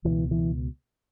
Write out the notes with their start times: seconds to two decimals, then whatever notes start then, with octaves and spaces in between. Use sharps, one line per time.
0.04 C#2 B2 E3
0.31 E3